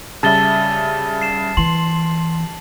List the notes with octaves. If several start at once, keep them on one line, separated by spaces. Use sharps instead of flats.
C#3 G3 E5 A5 A6 G7
C7 E7
E3 C6 F#7